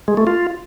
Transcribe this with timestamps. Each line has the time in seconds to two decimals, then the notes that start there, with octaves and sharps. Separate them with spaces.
0.08 G#3
0.17 A3
0.27 F4